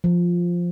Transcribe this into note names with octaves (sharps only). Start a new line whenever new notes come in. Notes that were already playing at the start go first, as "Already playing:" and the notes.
F3